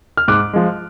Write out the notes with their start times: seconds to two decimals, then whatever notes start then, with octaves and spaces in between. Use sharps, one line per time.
0.17 F6
0.28 G#2 D6 F#6
0.53 F3 G#3